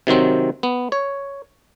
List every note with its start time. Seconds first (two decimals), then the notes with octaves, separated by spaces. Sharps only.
0.07 C3 D#3 F#3 C4
0.63 B3
0.92 C#5